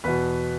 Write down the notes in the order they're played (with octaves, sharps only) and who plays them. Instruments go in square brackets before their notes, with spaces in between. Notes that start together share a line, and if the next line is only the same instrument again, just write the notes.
[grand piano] E2 B2 B4